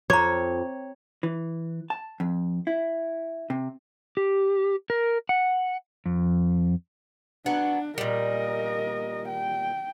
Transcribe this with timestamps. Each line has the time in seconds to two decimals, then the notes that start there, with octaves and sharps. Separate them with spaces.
0.10 F2 C#5 A#5 D6
1.23 E3
1.90 A5
2.20 F2
2.67 E4
3.50 C3
4.17 G4
4.90 A#4
5.29 F#5
6.06 F2
7.46 F#3 B3 D4 F#5
7.98 A#2 G3 A#4 D#5
9.28 G5